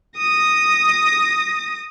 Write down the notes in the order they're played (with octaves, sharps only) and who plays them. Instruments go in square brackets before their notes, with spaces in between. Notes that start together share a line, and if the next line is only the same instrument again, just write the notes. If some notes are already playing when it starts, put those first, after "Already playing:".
[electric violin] D#6 A#6